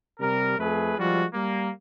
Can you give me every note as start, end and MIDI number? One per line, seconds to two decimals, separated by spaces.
0.20 0.55 48
0.20 0.55 55
0.20 0.55 70
0.59 0.94 41
0.59 0.94 57
0.59 0.94 68
0.59 0.94 71
0.98 1.24 53
0.98 1.24 55
0.98 1.24 56
0.98 1.24 65
0.98 1.24 66
1.34 1.70 55
1.34 1.70 58